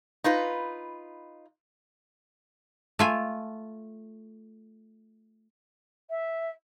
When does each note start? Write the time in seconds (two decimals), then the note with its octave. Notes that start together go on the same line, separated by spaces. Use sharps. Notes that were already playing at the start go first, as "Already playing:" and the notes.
0.24 D#4 F4 B4
2.99 A3 F4 G#5
6.09 E5